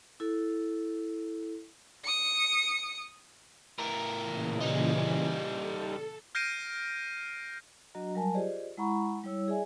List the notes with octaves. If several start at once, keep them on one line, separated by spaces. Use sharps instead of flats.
E4 A4
D#6 C#7
A2 A#4
A#2 C#3 E3
G3 D#4
A4
F6 G6 A#6 C7 D7 D#7
F#3 D4 F#4 D#5 A#5
F#3 G3 A#4 G#5 A5
F4 G4 G#4 C5 D5 D#5
G#3 E4 F#5 A#5 B5 C#6
G3 E4 C#5 E6
G#4 D5 E5 G#5